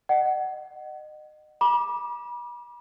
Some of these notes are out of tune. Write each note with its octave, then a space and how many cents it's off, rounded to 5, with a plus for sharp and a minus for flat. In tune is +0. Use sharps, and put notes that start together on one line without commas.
D#5 -30 F#5 +25
B5 -40 D6 +10